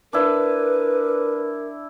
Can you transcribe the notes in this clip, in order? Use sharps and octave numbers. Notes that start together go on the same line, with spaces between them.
D4 E4 A#4 B4